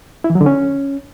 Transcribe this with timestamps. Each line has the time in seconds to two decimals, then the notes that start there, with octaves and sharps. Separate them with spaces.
0.24 E4
0.30 E3
0.35 F#3
0.41 D3
0.46 C#4